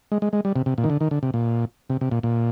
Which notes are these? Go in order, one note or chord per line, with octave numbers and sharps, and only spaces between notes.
G#3
G#3
G#3
G3
C3
C3
A#2
D#3
D3
D#3
D3
C3
A#2
C3
C3
A#2
A#2